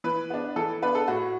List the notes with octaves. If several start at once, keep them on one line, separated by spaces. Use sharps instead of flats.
E3 B4
B3 D4
E3 A4
B3 D4 B4
A4
A2 F#4